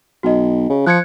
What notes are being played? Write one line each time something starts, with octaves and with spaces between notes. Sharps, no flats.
B1 F#4 D#5
C#3
F3 F#6 G#6 C#7